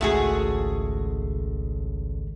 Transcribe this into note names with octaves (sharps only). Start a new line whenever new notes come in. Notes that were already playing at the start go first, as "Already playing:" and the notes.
G#1 C#2 A3 F#4 G#4